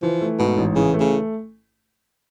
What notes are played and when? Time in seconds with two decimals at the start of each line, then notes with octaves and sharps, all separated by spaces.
0.02 E3 F3
0.21 A3
0.39 G#2 B2
0.58 A1
0.75 C#3 E3
0.94 A3
1.00 C#3